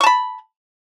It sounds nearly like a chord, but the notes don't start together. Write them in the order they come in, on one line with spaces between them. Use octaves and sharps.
C#6 A5 B5